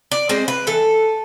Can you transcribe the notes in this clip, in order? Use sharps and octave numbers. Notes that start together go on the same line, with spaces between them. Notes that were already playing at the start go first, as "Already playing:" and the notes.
D5
G#3 C4 C5
B4
E3 A4